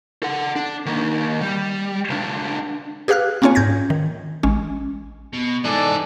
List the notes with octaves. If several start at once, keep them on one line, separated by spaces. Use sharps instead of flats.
A4 F#5
D4
D#3 A#3
G3
C#2 D4
G4 G#4 B4 F5 F6 F#6
A#3 C4 C#4 F4 C#5 G#5
G#2 G6 G#6 A#6
D#3
A1 G#3 C#4
B2
E3 D4 D#4 G#4 A4 D5